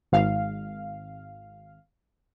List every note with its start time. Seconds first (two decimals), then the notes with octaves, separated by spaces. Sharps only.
0.12 G#1 F5